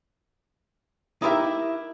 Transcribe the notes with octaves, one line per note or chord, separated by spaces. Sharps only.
D#4 E4 G4 A#4 E5